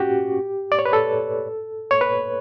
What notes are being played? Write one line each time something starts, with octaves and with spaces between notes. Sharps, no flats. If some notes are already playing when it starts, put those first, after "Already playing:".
Already playing: C#4 F#4 G4
D5
C#5
B4
A4
C#5
B4